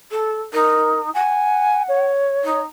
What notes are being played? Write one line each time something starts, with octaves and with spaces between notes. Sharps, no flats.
A4
D#4 A#4
F#5 G#5
C#5
D#4